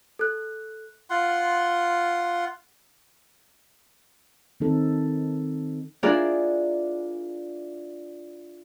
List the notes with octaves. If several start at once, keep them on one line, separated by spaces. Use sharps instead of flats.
A4 F#6
F4 F#5 C6
D#3 C4 D#4 A4
D4 E4 F4 G#4 A#4 D5